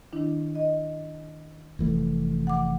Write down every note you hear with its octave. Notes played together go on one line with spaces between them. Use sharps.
D#3 D4 E4
D#5
F1 E3 A3
F#5 D6